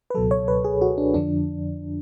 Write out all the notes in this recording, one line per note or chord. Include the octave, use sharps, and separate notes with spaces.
B4
C#2 B2 F#3 A4
C#5
B4
G#4
F#4
D4
F2 D3 F3 D4